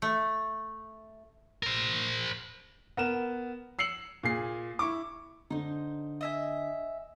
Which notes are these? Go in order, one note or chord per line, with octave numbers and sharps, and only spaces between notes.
A3
A#4 C5
B3 A#4 E7
E6 C7 C#7 F#7
A#2 G#4 C7
E4 C#6 D6
D3 D#4 C5
D#5 E5 G#5